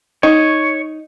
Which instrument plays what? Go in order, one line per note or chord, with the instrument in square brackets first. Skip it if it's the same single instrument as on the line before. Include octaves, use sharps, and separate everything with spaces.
[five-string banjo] D#4 [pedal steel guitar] C#5